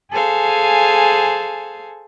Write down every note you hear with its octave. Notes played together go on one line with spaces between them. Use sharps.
G#4 A4 C5 F5 G#5